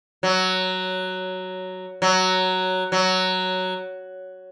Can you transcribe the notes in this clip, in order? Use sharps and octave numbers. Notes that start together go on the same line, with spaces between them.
F#3
F#3
F#3